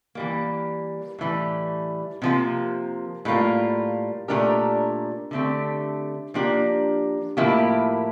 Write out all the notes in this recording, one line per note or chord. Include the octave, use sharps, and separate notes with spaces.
E3 G3 A#3
A2 E3 G3
C3 F3 A#3
A2 G3 A#3 F4
A#2 A3 D4 G4 A#4
D3 A3 C4 G4
F3 A#3 D4 G4
A2 F3 A#3 E4 G4